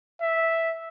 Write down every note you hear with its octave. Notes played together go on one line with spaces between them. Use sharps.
E5